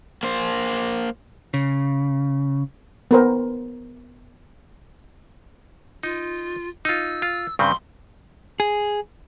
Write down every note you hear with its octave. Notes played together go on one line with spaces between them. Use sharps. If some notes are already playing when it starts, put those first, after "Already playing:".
A#3 C5
C#3
B3 A#4 C5
D#4 F4
D#4 F4 E6
F4
G2 C#3 C4 C6
G#4